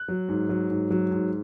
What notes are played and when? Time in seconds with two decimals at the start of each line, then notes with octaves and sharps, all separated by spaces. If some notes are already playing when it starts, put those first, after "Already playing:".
Already playing: F#6
0.08 F#3
0.29 G#2
0.49 F#3
0.70 G#2
0.90 F#3
1.11 G#2